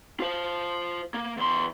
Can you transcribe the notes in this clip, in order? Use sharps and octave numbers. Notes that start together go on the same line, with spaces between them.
F4 C5
A#3
E2 C6